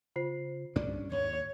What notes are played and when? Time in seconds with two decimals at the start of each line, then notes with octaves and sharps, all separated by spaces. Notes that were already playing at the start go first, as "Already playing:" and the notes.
0.16 C#3 F4 C5 C7
0.76 C2 G2 C#4 D4 D5
1.12 D#2 G#2 C#5